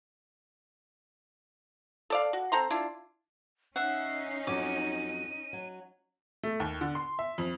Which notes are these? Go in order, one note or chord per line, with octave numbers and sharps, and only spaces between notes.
A4 D5 F5
F#4
C4 A4 A#5 C6
D4 E4 F4
C#4 D#4 E5 F#5 C7
F2 F#3 F#4 D6 D#7
F#3
A3
D#2
D3
C6
E5
F2